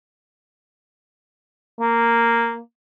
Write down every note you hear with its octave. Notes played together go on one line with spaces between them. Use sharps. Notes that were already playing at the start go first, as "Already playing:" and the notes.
A#3